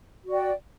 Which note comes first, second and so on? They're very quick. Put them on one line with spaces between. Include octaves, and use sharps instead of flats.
F#4 D5 G5